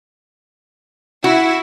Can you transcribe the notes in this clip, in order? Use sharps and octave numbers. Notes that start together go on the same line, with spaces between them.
E4 F#4